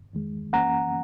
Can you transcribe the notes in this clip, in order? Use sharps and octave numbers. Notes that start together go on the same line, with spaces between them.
E2 D#3 G#3
F#2 E3 A#3 C#4 F#5 A#5